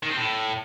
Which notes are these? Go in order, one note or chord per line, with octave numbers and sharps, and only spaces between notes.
D#3
C4
A2